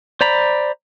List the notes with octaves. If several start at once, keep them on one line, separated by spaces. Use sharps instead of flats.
C5 D5 A#5 B5